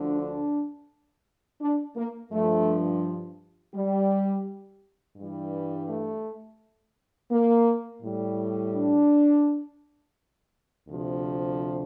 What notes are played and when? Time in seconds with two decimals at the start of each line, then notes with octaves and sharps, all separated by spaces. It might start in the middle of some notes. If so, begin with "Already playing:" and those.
Already playing: D2 D3 F3
0.18 D4
1.61 D4
1.96 A#3
2.32 G2 F3 A3
3.75 G3
5.17 G2 E3 G3
5.88 A3
7.31 A#3
8.02 A2 G3
8.74 D4
10.88 D2 C3 F3